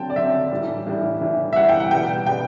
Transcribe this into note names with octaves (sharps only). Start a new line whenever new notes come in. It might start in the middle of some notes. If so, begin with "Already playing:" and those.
Already playing: D3 F#3 C4 G5 A5
D5
D3 F#3 C4 E5
A2 E3 G3
A2 E3 G3
A2 E3 G3
E5
A2 E3 G3 F#5
G5
F#5
B2 G3 B3 G5
B2 G3 B3 G5